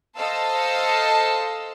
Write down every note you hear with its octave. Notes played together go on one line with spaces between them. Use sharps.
A4 C5 D#5 F5 A5 E6